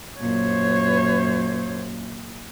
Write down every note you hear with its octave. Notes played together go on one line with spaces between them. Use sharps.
F#2 A#2 C5 C#5